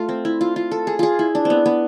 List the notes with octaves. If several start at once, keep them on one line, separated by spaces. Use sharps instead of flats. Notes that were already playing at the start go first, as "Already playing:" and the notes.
Already playing: A3 F4
C4
E4
F4
F4
A4
G#4
F4 G#4
E4
D4
B3 C4
B3